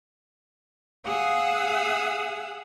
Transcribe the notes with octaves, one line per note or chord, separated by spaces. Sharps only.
G#4 F5 F#5 D#6 E6